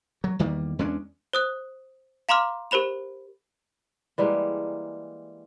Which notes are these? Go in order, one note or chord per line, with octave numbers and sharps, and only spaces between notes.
F#3
E2 D#3 G3 A#3
E2 G#3 C#4 D4
C5 D#6 F#6
F5 A#5 C6 D6 F6
G4 A#4 C5 B5 F7
E3 G3 G#3 A#3